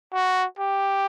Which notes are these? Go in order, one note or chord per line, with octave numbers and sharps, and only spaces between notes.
F#4
G4